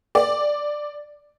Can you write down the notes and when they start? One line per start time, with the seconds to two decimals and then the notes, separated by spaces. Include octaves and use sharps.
0.15 D5